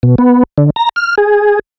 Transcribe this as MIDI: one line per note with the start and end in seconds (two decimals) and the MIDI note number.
0.03 0.15 47
0.18 0.43 59
0.58 0.70 50
0.76 0.89 82
0.96 1.15 89
1.18 1.59 68